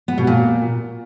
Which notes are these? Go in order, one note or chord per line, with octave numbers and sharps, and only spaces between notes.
B3
B2
A#2